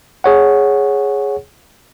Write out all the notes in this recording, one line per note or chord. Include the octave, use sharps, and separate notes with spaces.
G#4 C#5 F#5